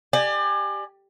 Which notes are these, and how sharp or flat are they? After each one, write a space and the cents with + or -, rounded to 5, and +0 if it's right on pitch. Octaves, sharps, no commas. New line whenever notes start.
G4 +5 D5 +30 G#5 +0